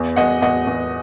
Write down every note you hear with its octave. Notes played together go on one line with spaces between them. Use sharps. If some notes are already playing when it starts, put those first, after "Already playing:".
Already playing: E2
E2 D#5 F#5
E2 D#5 F#5
E2